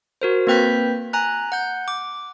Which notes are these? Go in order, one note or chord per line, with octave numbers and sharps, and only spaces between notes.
F#4 A#4 C5
A#3 C4 B4 G5 G6 B6
G#5 A#5 F#6
F#5 G6
D6